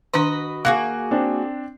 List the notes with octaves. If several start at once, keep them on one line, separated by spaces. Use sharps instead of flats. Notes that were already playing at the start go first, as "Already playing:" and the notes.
D#3 D4 F#4 B4 D#5
A#3 F#4 G#4 F5 F#6
C4 D4